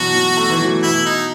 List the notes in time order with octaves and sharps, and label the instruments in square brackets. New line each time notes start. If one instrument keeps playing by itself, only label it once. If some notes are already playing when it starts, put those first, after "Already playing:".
Already playing: [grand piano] B2 E3 F#3 [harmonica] F#4
[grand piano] F#3
A3
E3
F#3
[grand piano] B2 [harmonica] E4
[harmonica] D#4